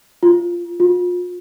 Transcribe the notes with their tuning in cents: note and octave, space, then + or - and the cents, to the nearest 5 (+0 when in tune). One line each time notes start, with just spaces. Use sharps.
F4 -5
F4 +35